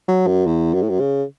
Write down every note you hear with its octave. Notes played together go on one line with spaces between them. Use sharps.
F#3
F#2
E2
F#2
A2
F#2
C#3